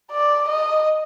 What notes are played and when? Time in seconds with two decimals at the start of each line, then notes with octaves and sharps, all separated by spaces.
0.12 D5
0.48 D#5